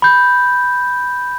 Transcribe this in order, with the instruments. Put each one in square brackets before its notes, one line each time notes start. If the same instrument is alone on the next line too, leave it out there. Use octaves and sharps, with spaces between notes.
[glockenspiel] B5 G6